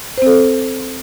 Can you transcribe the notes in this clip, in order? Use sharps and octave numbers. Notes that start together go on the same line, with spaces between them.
C4 A4 C5